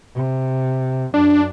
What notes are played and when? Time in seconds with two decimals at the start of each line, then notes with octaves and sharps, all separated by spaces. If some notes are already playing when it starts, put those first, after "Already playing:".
0.15 C3
1.14 F#2 D4